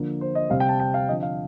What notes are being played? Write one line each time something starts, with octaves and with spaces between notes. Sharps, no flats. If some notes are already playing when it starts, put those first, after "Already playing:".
Already playing: D3 F3 A#3
C5
D#5
C3 G3 C4 F5
G5
A5
G5
F5
D3 F3 C4 D#5
F5